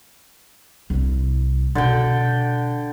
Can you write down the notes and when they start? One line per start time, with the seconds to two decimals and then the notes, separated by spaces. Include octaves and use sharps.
0.90 C2 E4
1.75 B2 D3 G5